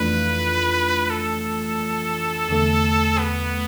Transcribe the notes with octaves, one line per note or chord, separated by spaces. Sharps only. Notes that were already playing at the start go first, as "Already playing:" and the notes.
Already playing: F2 E3 A3 D4 F4 B4
A4
E2 D3 A3
B3